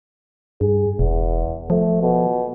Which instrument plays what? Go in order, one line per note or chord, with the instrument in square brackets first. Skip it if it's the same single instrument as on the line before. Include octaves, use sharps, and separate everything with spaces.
[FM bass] G2 [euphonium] G#4
[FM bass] E1 [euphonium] E2
[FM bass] F3 [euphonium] A3
[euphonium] B2